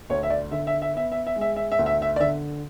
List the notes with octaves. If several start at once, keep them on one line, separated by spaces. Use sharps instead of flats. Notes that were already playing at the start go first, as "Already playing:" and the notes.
D2 C#5
E5
D5
D3 E5
E5
E5
B3 E5
E5
E5
G#3
E5
E5
E5
D2
E5
E5
D5
D3 E5